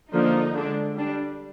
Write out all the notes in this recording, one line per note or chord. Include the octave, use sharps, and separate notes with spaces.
D3 F3 A#3 D4 D#4
D3 G#3 D4
G3 D4